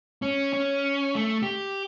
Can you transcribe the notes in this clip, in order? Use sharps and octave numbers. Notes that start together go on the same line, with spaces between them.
C#4
C#4
A3
G4